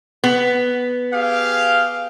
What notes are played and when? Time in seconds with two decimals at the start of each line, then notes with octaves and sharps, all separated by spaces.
0.24 B3
1.13 G4 G#4 F5